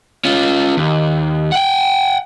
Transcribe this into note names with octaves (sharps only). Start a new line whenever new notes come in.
C#4 F4
D#2
F#5 G5